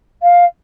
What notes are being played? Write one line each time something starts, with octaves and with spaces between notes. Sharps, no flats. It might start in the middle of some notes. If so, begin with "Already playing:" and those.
F5